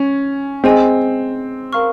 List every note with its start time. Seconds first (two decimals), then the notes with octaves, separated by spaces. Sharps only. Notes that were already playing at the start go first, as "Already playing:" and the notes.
Already playing: C#4
0.64 C4 G#4 D#5 G#5
1.73 A#4 F5 A#5 C#6 F6